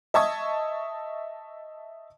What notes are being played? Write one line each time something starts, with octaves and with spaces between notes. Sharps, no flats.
D#5 E5 A5 C#6 D#6 G#6